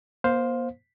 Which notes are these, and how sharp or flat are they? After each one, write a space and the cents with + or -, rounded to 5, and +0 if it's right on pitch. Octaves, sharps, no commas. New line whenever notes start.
A#3 +45 C5 +0 F5 +15